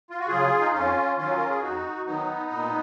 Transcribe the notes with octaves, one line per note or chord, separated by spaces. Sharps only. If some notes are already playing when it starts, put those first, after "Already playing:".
F4
F#4
C#3 F#3 F4 G#4
D#4
F2 C#4 F4
D#3 F#3 C#4 F4
A#4
G#4
F2 D#4 F#4
D#3 F#3 B3 D#4
A#2